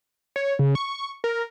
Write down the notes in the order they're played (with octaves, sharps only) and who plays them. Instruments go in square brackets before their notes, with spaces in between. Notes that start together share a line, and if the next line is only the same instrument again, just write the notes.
[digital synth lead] C#5
C#3
C#6
A#4